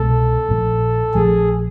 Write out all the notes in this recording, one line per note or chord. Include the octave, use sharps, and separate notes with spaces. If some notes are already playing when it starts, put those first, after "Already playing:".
Already playing: C2 B2 G#3 A4
A#1 A#2 F3 A3
A#1 A#2 F3 A3 G#4